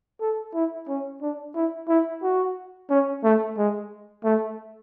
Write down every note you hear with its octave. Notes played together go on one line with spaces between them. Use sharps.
A4
E4
C#4
D4
E4
E4
F#4
C#4
A3
G#3
A3